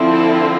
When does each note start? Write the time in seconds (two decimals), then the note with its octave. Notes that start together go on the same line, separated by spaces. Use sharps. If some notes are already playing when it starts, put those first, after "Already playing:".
Already playing: D3 F3 C4 E4
0.10 A4